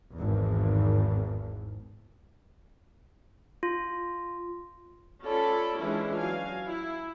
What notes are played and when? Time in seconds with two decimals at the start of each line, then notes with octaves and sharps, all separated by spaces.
0.15 G#1 E2
3.63 F4
5.24 C#4 F4 A4 D5 B5
5.78 E3 G#3 C#4 D4 E4 F4
6.16 F#3 F5 G#5
6.67 E4